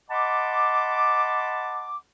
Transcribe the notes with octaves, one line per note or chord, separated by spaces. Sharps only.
D#5 F#5 A5 B5 C6 D6